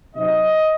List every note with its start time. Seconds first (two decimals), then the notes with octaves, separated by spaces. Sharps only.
0.15 C3 F#3 C4 D#4 D#5